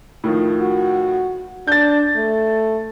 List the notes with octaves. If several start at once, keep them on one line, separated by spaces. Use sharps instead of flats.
A2 D#3 F3
F#4
D4 G6 A6
A3